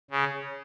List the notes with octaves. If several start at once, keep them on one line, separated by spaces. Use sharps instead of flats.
C#3